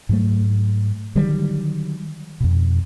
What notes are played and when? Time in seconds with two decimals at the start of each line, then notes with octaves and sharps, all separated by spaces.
0.09 G#2 F#3 A3
1.15 D3 D#3 F#3 G3
2.40 F2 B2